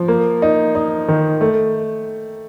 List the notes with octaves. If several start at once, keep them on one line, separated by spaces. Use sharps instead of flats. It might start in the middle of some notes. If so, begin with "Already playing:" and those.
Already playing: F3
A#3
D#4
D#4
D#3
A3